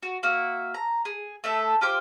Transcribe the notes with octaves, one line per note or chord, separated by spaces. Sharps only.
F#4
A#3 F#4 E5
A#5
G#4
A3 A4 E5
F4 G4 C5 D6